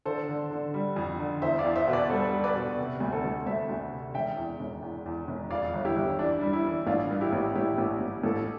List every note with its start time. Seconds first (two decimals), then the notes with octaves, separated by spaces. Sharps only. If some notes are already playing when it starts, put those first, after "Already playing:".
0.05 D3 A4 C5
0.29 D3
0.51 D3
0.74 G3
0.96 F2
1.19 D3
1.42 E2 C5 E5
1.59 D5 F5
1.65 E2
1.76 C5 E5
1.88 B2
1.93 B4 D5
2.10 G3 A4 C5
2.33 G3
2.44 B4 D5
2.56 B2
2.78 C3
3.00 D2
3.12 A4 C5
3.23 D2
3.46 D2 C5 E5
3.69 D2
3.92 C3
4.14 E1 E5 G5
4.37 E2
4.60 E1
4.82 E2
5.06 E2
5.28 E1
5.51 F2 D5 F5
5.74 G1
5.85 E4 G4
5.96 G1
6.19 E3 D4
6.41 G3
6.53 E4
6.65 E3
6.86 A1 D4 F4
7.10 G2
7.21 E4 G4
7.33 A1
7.55 A1 E4 G4
7.78 A1
8.01 A1
8.23 A1 F4 A4